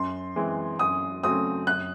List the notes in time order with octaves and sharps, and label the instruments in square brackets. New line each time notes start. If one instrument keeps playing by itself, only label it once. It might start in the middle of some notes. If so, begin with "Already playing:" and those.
Already playing: [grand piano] F#2 [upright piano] C6
[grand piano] E3 G#3 C4
[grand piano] F#2 [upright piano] D#6
[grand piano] C#3 F#3 A3 C4 [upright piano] D#6
[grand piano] F#2 [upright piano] F#6